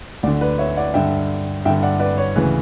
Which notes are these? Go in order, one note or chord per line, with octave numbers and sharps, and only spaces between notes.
D2 D3 D5 F#5
B4 D5
C#5 E5
D5 F#5
G2 D3 E5 G5
G2 D3 E5 G5
D5 F#5
B4 D5
C#5
D2 C#3 E3 B4